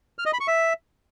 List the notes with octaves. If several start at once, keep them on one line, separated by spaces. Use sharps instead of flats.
F6
D#5
B5
C#6
E5